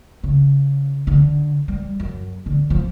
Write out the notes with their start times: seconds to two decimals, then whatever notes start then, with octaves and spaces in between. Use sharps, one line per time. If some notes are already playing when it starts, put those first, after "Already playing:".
0.23 C#3
1.07 D3
1.68 G3
2.00 F#2
2.46 D3
2.70 F3